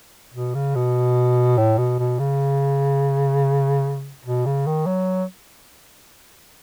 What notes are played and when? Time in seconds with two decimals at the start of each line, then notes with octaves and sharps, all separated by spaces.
0.34 B2
0.54 C#3
0.76 B2
1.58 A2
1.78 B2
1.99 B2
2.19 C#3
4.25 B2
4.46 C#3
4.67 D#3
4.87 F#3